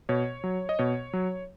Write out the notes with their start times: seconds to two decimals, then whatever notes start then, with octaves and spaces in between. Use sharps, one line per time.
0.09 B2 C#5
0.44 F#3
0.69 D#5
0.79 B2 C#5
1.13 F#3